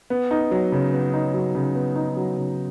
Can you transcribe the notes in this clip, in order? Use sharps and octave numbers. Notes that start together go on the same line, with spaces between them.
B3
D#4
F#3
C#3
B3
D#4
F#3
C#3
B3
D#4
F#3
C#3